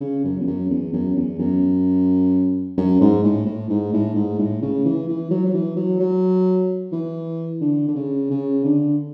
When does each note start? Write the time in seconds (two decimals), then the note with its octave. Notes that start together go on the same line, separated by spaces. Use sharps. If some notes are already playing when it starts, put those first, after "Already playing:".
0.01 C#3
0.24 F#2
0.40 E2
0.47 F#2
0.70 E2
0.92 F#2
1.16 E2
1.39 F#2
2.78 F#2
3.01 G#2
3.24 A2
3.46 A2
3.69 G#2
3.93 A2
4.15 G#2
4.39 A2
4.62 C#3
4.85 E3
5.08 E3
5.31 F#3
5.46 F#3
5.54 E3
5.76 F#3
6.00 F#3
6.92 E3
7.61 D3
7.88 D3
7.95 C#3
8.30 C#3
8.65 D3